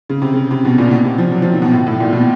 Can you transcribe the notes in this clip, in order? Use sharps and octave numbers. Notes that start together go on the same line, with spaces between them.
C#3
C3
C#3
C3
B2
A#2
B2
C3
F3
F#3
F3
D#3
B2
A2
A2
A#2
B2